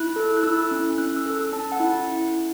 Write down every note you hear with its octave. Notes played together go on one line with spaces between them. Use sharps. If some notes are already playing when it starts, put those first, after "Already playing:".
Already playing: E4 F#6
A4
F#6
E4 E6
C#4
C#4 F#6
E6
A4
C#4 A5
F#5
E4